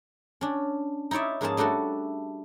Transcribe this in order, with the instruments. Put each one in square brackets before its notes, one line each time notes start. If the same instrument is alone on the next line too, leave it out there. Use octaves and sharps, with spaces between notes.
[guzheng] C#4 D4
D#4 E4 C#5 D5 E5
G#2 F3 A#3 C#4 G#4 A5
G3 A3 D4 F#4 A4